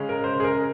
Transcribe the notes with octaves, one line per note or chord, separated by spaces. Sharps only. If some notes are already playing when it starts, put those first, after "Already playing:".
Already playing: C#3 G#3 C#4
A#4
C5
G#4
A#4